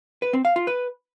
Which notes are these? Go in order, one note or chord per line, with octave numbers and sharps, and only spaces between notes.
B4
C4
F5
F4
B4